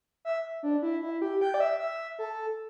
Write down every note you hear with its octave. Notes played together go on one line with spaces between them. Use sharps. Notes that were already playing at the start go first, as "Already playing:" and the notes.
E5
D4
E4
E4
G4
G5
D5
E5
E5
A4